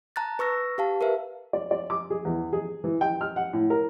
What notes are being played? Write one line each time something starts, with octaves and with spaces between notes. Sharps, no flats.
A5 A#5 F#6 A6
B4 C#6 E6 A#6
G4 F5 A5
A#4 B4 E5
D5
D5
D6
G#4
E2
G#4
E3
G5
F6
F#5
A2
A#4